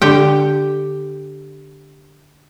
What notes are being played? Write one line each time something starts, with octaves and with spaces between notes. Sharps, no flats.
D3 G4 G5